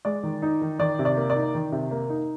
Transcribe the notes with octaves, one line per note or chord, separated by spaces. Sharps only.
G#3 D5
D#3
D#4
D#3
D#3 D5
C3
D5
A#3
D5
D#4
D#3
C3
A#3
D#4